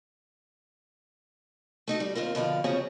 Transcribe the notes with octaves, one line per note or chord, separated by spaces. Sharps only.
A3 D#4 F#4
G3
D#2 C4 F4 A#4
B2 D3 F3 F5
C#3 F3 F#3 C4 C#4 G#4